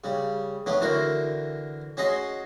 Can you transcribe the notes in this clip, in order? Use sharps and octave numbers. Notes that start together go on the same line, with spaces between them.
C#3 G3
A3 B3 C#4 D4
D3 E3 F#4 A#4 C5
C#4 F#4 G#4 D#5 C6